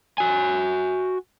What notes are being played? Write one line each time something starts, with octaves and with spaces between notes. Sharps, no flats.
F#4 G#5